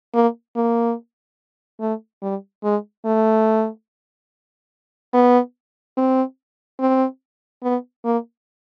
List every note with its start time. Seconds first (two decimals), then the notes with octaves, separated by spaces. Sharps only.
0.14 A#3
0.56 A#3
1.80 A3
2.22 G3
2.64 G#3
3.05 A3
5.14 B3
5.97 C4
6.80 C4
7.63 B3
8.05 A#3